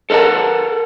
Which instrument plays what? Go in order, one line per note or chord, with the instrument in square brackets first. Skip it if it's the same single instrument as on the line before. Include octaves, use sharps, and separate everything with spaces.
[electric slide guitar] A4 A#4 D5 F#5 A5